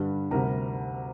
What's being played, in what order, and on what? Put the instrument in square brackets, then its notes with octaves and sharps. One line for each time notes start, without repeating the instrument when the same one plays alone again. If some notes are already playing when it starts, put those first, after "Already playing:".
Already playing: [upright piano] G2 D3 G3
D2 C3 G3 A#4 A#5